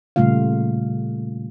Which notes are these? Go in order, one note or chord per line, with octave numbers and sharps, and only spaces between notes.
A#2 C#3 G3 A3 F4 F5